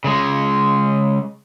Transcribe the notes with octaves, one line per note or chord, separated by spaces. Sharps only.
C#3 G#3